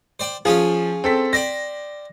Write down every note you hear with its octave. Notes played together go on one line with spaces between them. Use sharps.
C5 D5 G5
F3 C#4 F4 G#4
C4 A4 B6
C5 D5 G5 A#6